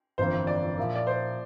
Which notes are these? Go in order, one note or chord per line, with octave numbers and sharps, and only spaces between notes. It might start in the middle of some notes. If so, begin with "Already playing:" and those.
G1 F2 E3 A#3 C5
D5
A#2 F3 A#3 E4 A#4
D5
C5